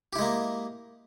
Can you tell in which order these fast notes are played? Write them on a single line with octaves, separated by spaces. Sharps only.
G4 E4 G#3 A#3